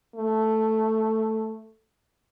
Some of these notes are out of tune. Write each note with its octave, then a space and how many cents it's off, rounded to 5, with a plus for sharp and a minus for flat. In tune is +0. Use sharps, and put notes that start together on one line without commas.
A3 +0